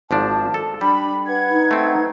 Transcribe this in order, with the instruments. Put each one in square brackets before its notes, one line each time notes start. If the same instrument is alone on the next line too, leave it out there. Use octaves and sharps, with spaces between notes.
[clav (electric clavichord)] G#1 F3 D4 [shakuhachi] A5
[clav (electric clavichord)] A4
[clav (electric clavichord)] G3 [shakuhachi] D4 [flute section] B5
[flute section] B4 F#5 G#6
[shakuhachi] D#4
[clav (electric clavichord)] A3 C4